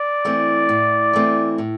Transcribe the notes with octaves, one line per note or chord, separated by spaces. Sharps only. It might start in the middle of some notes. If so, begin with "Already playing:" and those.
Already playing: D5
E3 A3 C4
A2
E3 A3 C4
A2